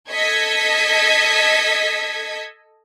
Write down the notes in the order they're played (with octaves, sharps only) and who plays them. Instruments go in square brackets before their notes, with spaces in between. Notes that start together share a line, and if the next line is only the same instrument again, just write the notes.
[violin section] A4 D#5 G#6 B6 C#7